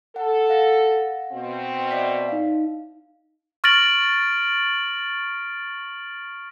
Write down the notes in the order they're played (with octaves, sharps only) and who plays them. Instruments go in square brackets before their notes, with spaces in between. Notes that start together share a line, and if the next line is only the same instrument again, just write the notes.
[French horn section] A4 [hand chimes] F#5
[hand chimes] F5 F#5 A#6
[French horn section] B2 C4
[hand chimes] D5 E5 B6
D#4 F5
[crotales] C#6 F6 A6 A#6 D7 F#7